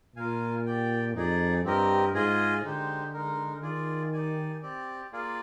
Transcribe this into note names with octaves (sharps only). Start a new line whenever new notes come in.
A#2 F4 A#4 F5 G#5
G4 D5 G5
F2 D#4 G#4 D5
G2 C4 G4 A#4 D#5
G#2 F4 G#4 D#5 G#5
D3 G#3 D#4 G4 C5
G#3 D#4 A#4
D#3 F4 G#4 D5
D#4 G4 D5 G#5
C4 G4 D5
A#3 F4 G#4 D5 F5